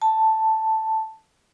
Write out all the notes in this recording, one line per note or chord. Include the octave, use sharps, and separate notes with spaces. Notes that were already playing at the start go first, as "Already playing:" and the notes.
A5